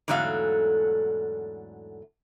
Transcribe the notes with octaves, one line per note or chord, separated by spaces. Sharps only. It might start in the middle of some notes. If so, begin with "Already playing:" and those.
E2 G#2 D3 F#3 A3 F5